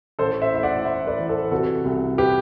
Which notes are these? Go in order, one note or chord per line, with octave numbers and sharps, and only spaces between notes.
A1 A4 C5
C5 E5
A2 E5
D5 F#5
A2 C5 E5
B4 D5
E3
A4 C5
C3 F#4 A4
C2
G4 B4